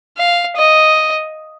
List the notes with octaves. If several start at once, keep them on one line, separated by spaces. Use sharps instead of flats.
F5
D#5